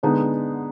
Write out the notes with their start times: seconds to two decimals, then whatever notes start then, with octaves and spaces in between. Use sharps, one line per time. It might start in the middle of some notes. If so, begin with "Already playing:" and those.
0.03 D3 G#3 B3 D#4